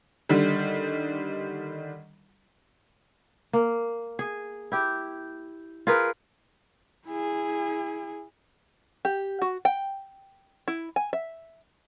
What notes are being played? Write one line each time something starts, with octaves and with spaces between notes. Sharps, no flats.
D3 D#3 G3
A#3
G#4
E4 G4
F4 G#4 A#4 B4
E4 G#4
G4
F#4
G5
E4
G#5
E5